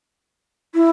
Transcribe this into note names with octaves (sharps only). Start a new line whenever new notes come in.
E4